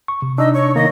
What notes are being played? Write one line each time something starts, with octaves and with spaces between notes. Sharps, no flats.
C#6
C3
D4 D#4 D#5 E6
C#5 C#6
D#3 A#3 D#5 A#6